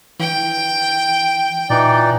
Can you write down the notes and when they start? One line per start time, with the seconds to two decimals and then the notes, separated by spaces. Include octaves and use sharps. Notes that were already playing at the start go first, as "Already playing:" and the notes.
0.20 E3 G5
1.70 A#2 E3 D#4 D5